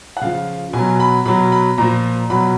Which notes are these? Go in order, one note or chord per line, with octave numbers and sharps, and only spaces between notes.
F#5
C#3 F3 F5
B2 G#5
F#3
B5
B2 F#3 B5
B5
A#2 F3 A#5
B2 F#3 B5